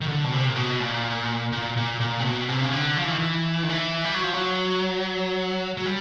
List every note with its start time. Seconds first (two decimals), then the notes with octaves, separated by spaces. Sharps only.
0.01 D#3
0.08 D3
0.24 B2
0.32 C3
0.48 A#2
0.56 B2
0.80 A#2
1.52 A#2
1.77 A#2
2.00 A#2
2.20 C3
2.24 B2
2.49 C3
2.61 C#3
2.73 D3
2.97 F3
3.04 E3
3.11 D#3
3.18 E3
3.63 D#3
3.69 E3
4.05 G3
4.14 F#3
4.24 F3
4.33 F#3
5.77 F#3
5.85 G3